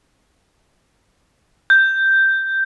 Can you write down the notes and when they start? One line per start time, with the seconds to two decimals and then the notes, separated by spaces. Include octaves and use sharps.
1.70 G6